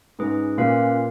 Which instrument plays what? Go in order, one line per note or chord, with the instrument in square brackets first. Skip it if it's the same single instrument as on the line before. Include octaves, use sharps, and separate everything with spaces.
[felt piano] G#2 [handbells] C#4 G#4 B4
[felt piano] A#2 [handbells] C#4 F4 B4 F5